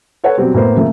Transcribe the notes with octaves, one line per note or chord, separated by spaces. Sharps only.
A4 B4 C#5 F#5
B2 F#3 G3 C4
A2 A#3 B3 C5
C#3 F3 A3 A#3